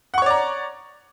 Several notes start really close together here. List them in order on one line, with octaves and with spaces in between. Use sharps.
F#5 C#6 C#5 D5 A#5